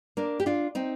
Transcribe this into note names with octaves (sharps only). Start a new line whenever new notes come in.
A#3 D4
G4
D4 F4
C4 D#4